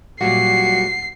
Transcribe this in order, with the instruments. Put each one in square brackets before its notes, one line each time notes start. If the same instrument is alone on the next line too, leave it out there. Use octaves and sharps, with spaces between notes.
[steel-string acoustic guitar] A#2 F#3 G3 [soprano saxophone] F#4 [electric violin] C7